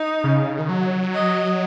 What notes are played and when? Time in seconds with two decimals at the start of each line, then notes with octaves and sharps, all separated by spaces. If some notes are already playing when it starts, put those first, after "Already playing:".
Already playing: D#4
0.24 C#3
0.59 D#3
0.69 F#3
1.14 D#5